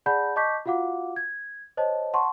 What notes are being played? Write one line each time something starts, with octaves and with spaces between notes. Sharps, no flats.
G#4 D5 F#5 A5 B5 G6
D#5 A5 C#6 D6 G6 B6
F4 F#4 F5 F#5 D6
G#6
C5 C#5 D#5 A5
F#5 A5 C6 C#6